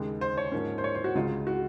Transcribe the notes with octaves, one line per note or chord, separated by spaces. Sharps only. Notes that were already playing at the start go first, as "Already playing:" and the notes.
Already playing: D#2 C#3 G#3
C5
C#5
G#2 F3 A#3 C#4
C5
C#5
C5
F#4
C#2 C#3 G#3 F4
F#4